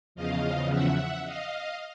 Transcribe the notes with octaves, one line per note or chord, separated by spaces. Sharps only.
E2 C#3 F3 D#5 F5
E5 F#5
D#5 F5